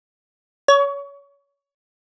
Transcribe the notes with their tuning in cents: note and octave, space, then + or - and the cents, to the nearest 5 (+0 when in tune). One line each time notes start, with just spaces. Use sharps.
C#5 +25